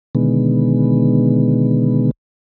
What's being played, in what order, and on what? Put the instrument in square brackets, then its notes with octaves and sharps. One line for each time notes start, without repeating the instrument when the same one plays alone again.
[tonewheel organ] B2 D3 D#3 G#3 B3